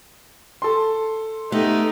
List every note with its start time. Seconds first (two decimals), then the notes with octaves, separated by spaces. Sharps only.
0.62 A4 C6
1.52 A3 B3 D#4 G4